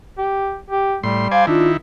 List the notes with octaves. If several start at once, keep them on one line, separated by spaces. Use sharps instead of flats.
G4
G4
A2 G3 C6
C5 D5 F5 G#5
D#3 D4 E4 F4